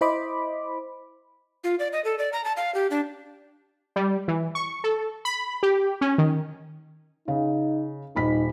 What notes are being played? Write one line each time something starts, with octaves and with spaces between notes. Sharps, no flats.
E4 C5 D#5 B5 D6
F4
D5
D#5
A4
D5
A#5
A5
F5
G4
D4
G3
E3
C#6
A4
B5
G4
C#4
D#3
C#3 D#4
D#1 D#4 B5 B6